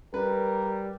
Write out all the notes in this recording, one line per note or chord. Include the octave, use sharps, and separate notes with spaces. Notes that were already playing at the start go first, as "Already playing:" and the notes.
G3 A#4 B4